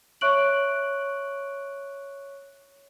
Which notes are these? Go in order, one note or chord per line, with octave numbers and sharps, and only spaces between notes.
C#5 E5 C#6 F#6 D7 F#7